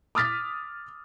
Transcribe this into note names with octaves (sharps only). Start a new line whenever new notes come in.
D6 D#6 F6 A6 B6